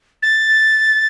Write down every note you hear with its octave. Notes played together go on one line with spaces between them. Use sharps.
A6